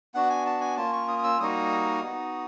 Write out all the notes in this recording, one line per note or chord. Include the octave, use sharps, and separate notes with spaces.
B3 D4 F#4 F#5
G#5
A5
G#5
A#3 C#4 F4 A5
C#6
D#6
D#6
E6
G3 A#3 D#4 F#4 D#6
B3 D#4 F#4